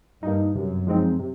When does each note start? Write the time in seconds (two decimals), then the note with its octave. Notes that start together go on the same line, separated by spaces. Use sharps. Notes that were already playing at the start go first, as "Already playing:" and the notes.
0.22 G2 A#3 D#4
0.55 F#2 C3
0.87 F3 G#3 C4 D#4
1.19 C3